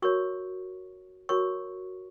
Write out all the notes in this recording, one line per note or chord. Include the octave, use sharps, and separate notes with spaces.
F#4 A#4 C#5 C#6
F#4 A#4 C#5 C#6